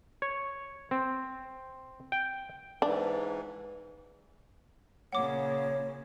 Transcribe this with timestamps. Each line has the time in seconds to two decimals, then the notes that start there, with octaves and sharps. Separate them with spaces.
0.22 C#5
0.91 C4
2.12 G5
2.82 G#2 E3 D4
5.13 A#2 C#3 C#5 F#5 D6